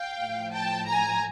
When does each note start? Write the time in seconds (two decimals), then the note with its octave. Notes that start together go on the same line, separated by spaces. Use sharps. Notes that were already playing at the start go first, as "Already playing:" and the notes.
Already playing: F5 G5
0.21 A2 F3
0.54 G5 A5
0.88 G#5 A#5